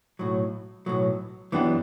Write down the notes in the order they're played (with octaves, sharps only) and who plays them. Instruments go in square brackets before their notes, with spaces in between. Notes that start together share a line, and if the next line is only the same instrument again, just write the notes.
[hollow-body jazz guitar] B1 A2 F#3
B1 A2 F#3
F#2 E3 B3 D4 G4